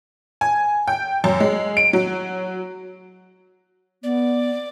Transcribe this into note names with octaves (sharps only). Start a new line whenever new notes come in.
G#5
G5
F#2
G#3
D7
F#3
B3 D5